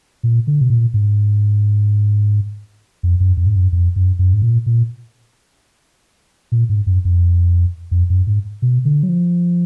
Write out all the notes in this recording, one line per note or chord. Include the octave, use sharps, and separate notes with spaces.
A#2
D3
B2
A#2
G#2
F2
F#2
F2
G#2
F#2
F2
F#2
F#2
G#2
A#2
A#2
A#2
G#2
F#2
F2
F2
F#2
G#2
B2
D3
F#3
F3